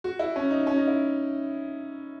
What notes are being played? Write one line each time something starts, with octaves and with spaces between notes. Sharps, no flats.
F#4
E4
C#4
D#4
C#4
D#4
E4